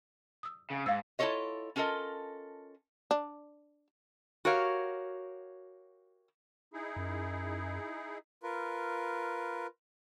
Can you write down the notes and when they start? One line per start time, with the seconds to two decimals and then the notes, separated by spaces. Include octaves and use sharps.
0.43 D#6 E6
0.71 C#3
0.86 G#2 F5 E6
1.19 E4 F4 G#4 A4 C#5 D#5
1.76 C#4 F4 A4 A#4 D#5
3.11 D4
4.45 F#4 G4 A#4 C#5 F5
6.73 D#4 E4 G#4
6.97 F#2
8.43 F4 A#4 B4